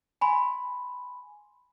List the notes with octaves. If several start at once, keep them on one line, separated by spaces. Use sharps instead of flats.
G#5 B5 C6